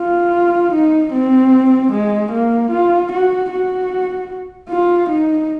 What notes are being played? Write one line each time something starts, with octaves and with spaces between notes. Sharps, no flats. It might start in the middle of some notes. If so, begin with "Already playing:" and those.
Already playing: F4
D#4
C4
G#3
A#3
F4
F#4
F#4
F4
D#4